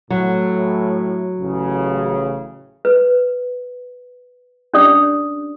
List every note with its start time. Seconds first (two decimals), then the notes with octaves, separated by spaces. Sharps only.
0.10 A2 F#3
1.40 A1 C#3
2.85 B4
4.74 C#4 D4 G4 D5 D6 D#6